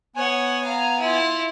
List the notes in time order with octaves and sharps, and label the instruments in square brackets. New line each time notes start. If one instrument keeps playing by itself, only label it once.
[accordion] B3 G#5 [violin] C#5 F#5
[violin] F5 A#5
E4 F4